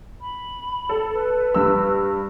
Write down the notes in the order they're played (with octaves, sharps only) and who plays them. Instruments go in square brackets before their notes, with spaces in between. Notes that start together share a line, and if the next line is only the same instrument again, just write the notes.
[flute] B5
[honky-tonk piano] A4
[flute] B4
[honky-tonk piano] G2 E6